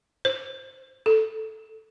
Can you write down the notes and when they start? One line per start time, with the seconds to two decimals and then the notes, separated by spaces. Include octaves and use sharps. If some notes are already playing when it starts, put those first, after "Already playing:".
0.25 C5
1.06 A4